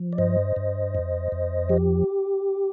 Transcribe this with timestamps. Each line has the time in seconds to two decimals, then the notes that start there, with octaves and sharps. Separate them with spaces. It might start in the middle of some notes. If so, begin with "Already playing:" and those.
Already playing: F3
0.13 D5
0.18 G2 C5 D#5
0.56 G2
0.95 F2
1.32 F2
1.69 F3 G4